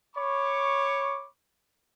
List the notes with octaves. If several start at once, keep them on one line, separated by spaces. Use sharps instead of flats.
C#5 B5 C#6 D6